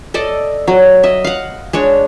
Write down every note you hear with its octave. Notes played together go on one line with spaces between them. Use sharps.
A4 D5 D#5
F#3
D#5 E5
F5 F#5
G#3 D4 C#5